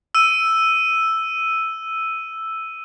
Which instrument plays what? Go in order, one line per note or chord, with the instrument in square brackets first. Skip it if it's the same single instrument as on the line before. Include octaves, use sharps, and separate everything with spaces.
[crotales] E6 D#7